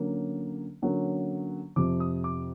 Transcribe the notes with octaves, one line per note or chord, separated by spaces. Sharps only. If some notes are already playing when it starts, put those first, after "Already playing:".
Already playing: D3 F#3 A#3 C#4
D3 F#3 A#3 C#4
F2 C3 F3 D6
D#6
D6